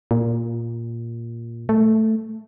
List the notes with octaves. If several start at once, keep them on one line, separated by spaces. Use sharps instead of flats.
A#2
A3